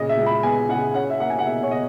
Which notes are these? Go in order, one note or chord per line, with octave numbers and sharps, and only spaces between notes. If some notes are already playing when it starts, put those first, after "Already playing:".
Already playing: A#2 C#3 D#5
E5
C#2
B5
B3 G#5
C#3 F#5
C#4 F#5
E5
A#3 F#5
G#5
F#5
B2 E5
C#5
B2 D#5